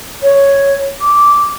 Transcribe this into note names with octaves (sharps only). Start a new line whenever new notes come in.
C#5
D6